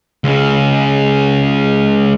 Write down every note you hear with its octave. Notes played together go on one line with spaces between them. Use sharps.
C#2 C#3